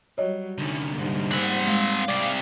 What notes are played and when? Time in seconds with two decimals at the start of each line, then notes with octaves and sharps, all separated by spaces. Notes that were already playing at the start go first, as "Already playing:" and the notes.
0.18 F#3 G3 C#5 D#5
0.58 C2 D3 D#3 C#4
0.95 G#2 G3 A#3
1.32 C4 F#5
1.67 G#3 F5
2.09 C3 D5